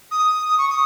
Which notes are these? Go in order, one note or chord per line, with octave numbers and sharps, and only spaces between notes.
D#6
C#6
D#6